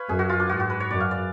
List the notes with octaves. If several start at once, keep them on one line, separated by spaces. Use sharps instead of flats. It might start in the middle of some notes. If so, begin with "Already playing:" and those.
Already playing: B4 C#5 F5
F#2 G#4
F#4
F4
D4
G#2 F#4
F#4
B4
C#5
F#2 D5
F5
D5